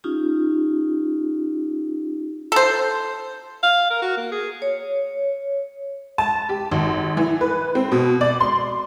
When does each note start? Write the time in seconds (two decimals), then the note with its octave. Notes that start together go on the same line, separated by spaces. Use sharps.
0.04 C#4 D#4 F4 G4
2.52 A4 C5
3.63 F5
3.90 A#4
4.02 F#4
4.17 A#3
4.32 G#4
4.62 C#5
6.18 A5
6.49 G4
6.72 G#1
7.17 E3
7.41 B4
7.75 C4
7.92 B2
8.21 D5
8.41 C6